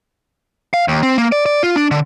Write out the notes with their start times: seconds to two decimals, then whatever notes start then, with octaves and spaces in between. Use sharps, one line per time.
0.74 F5
0.88 D#2
1.03 C4
1.18 A#3
1.32 D5
1.46 D5
1.63 F4
1.76 D4
1.91 D3